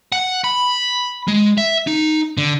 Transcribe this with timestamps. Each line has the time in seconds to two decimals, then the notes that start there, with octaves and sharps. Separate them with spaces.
0.12 F#5
0.44 B5
1.28 G#3
1.58 E5
1.87 D#4
2.37 D3